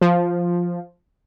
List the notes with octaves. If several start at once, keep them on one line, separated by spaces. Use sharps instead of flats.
F3